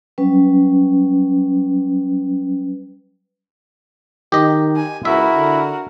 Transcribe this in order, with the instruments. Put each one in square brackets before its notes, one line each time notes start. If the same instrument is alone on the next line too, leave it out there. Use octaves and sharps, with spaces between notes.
[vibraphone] F#3 G3 C#4 B4
[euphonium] D#3 [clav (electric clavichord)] G4 D#5
[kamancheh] G#5
[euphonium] C#2 [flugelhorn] E4 [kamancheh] F#4 A#4 [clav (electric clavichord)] E5
[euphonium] D3